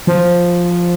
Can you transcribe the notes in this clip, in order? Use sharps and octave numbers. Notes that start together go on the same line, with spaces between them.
F3